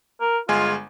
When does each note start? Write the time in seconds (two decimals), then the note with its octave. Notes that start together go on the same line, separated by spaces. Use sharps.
0.21 A#4
0.49 G1 G#3 F4 G#5